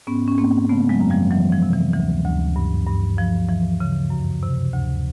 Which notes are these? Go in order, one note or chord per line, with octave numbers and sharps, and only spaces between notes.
G#2 B3 C#4
C#4
G#2 A#3 C4
C#3 A3 B3
F#3 G#3
F#2
F3 G3
E3 F#3
F3
C3
E3
D2 E3
D2
G2
G2
G2 F3
E3 F3
C#3
F#2
C3
D2